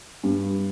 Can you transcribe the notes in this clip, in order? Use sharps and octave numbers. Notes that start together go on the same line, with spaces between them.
G2